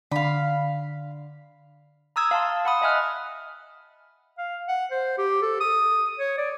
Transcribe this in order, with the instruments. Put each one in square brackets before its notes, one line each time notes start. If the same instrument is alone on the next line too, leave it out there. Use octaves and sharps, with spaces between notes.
[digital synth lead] D3 [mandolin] F5 B5
[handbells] A#5 D#6 E6 G#6
F5 A5 C6
F#5 B5 D#6 E6
D#5 E5 G#5 F6 F#6
[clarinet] F5
F#5
C5
G4
A4
D#6
C#5
D5